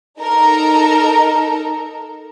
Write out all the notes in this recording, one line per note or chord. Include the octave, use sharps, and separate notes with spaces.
D#4 A4 A#4 A#5